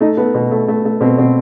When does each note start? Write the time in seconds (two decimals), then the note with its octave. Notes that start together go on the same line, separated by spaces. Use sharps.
0.01 A3 D#4
0.17 A3 B3
0.35 B2
0.51 A3
0.68 A3
0.85 A3
1.01 B2 C4
1.19 B2 C4